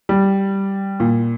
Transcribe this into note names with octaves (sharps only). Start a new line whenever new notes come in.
G3
A#2